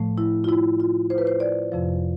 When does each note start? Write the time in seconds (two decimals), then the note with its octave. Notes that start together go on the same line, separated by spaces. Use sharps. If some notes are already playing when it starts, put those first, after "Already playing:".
Already playing: A2 F3 A3
0.18 E4
0.44 F4
0.49 E4
0.80 F4
1.10 C5
1.18 B4
1.27 C5
1.40 D5
1.72 F2 C3 F3